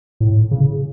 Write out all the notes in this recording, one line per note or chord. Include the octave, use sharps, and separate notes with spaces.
A2
C#3